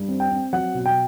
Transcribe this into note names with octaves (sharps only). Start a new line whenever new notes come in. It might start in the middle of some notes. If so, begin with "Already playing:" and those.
Already playing: G2
C4
G5
C4
F#3 F#5
B2
G5